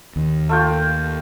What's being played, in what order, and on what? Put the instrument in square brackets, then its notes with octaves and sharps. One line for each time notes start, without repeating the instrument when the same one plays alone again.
[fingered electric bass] D#2
[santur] A3 F4 G5